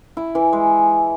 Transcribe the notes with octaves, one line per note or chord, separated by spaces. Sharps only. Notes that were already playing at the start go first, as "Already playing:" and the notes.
E4
E3
G#3